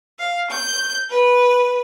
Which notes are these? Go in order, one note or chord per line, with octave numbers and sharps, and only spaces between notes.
F5
G6
B4